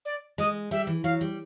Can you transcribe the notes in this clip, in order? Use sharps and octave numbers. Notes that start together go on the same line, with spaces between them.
D5
G#3 D#5
G3 E5
E3
F#3 F5
G3